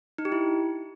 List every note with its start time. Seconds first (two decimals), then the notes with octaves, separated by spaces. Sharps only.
0.18 D#4
0.25 G4
0.32 E4